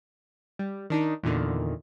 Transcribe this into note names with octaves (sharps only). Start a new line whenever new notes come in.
G3
D#3 D4 D#4
E2 A#2 D3 D#3